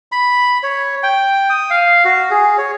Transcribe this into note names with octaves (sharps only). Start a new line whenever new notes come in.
B5
C#5
G5
D#6
F5
F#4
G#4
C#5